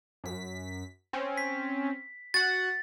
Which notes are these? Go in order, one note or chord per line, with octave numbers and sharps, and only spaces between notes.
F#2 B6
C4 C#4
B6
F#4 F#5 A6